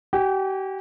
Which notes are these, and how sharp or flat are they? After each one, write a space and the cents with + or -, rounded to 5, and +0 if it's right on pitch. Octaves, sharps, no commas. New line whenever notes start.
G4 -40 G5 +45